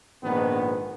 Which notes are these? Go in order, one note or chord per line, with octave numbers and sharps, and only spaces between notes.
A#1 G#2 D#3 B3